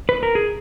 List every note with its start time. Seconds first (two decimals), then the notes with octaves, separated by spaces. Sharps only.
0.09 B4
0.23 A#4
0.35 G#4